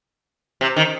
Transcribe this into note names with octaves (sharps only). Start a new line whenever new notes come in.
C3
D#3